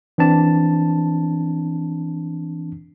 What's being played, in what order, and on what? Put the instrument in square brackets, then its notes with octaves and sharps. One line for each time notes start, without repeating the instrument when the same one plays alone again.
[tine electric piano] E3 C4 D4 A5